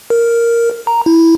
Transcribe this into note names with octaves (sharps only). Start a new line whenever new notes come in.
A#4
A#5
E4